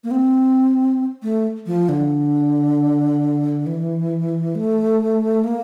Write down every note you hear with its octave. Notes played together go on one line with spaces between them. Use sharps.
A#3
C4
A3
F3
D3
E3
A3
A#3